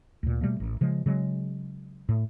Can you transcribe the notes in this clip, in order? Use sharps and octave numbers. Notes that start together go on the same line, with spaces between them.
D2 A#2
B2 G3 A3 A#3
A1
C#3 F3 G#3
C#3 F#3 G#3
A2